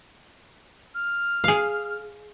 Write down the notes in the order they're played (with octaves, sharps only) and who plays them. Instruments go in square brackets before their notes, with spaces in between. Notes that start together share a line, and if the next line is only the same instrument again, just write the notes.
[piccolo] F6
[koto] G#4 F5